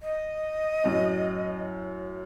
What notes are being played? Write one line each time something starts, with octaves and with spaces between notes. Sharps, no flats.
D#5
F#2 A2